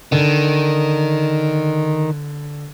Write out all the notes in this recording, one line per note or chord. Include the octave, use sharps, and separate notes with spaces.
D3 D#3